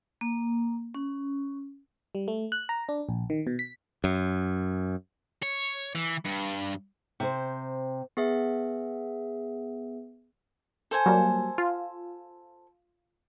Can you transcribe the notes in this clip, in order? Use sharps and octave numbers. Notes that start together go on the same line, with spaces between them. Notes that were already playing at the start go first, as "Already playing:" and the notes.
A#3
C#4
G3
A3
F#6
A#5
D4
A#1
D#3
B2
B6
F#2
C#5
E3
G2
C3 C5
B3 G#4 E5
A4 C5 G#5
F#3 G3 A#3
F4